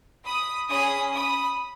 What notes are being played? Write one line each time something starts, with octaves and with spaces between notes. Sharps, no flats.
B5 D#6
C#4 G#4 B5 D#6
B5 D#6